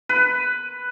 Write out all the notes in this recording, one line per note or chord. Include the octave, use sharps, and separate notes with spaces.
B4